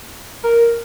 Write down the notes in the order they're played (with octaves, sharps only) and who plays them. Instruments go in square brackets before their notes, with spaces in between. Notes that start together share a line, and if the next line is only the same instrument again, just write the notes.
[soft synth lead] A#4